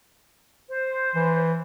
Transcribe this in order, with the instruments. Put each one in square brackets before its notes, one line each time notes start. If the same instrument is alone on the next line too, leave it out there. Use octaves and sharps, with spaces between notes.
[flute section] C5
[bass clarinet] E3